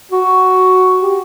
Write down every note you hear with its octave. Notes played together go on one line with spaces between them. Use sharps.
F#4
G4